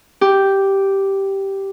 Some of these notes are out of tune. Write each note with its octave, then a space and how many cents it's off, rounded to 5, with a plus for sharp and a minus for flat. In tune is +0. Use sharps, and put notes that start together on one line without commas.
G4 -5